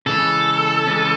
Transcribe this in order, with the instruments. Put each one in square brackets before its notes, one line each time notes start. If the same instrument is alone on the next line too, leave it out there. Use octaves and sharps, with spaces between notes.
[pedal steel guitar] C#3 E3 G#3 C#4 [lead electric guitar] A4
[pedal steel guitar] C#3 E3 G#3 C#4